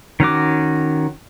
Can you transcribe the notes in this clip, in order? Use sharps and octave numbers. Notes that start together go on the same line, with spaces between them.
D#3 C#4 F#4 D6